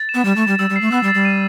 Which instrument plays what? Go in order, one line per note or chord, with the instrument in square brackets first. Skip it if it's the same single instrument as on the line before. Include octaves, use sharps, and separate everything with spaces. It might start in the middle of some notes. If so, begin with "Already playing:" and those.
Already playing: [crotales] A6
E7
[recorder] B3
[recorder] G3 [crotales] E7
[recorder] A3
[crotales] E7
[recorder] G3
[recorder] G3 [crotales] E6
[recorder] G3
[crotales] C7
[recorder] A3
[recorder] B3 [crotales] E6
[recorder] G3
[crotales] A6
[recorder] G3
[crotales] D#7